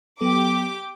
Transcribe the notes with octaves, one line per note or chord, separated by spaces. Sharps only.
F#3 B3 G4 A4 D6